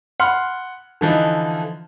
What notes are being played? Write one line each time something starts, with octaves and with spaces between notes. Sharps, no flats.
F#5 B5 C6 F6
D3 E3 F3 D#4